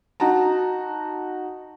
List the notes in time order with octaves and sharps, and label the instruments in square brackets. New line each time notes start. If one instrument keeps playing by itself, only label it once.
[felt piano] D#4 F#4 A5 A#5